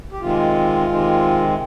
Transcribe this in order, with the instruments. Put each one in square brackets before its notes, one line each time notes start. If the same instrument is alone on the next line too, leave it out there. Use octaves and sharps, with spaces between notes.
[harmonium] G4
C3 D#3 G#3 C4 F4
C3 D#3 G#3 C4